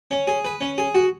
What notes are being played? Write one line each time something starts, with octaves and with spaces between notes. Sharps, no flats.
C#4
G#4
B4
C#4
G#4
F#4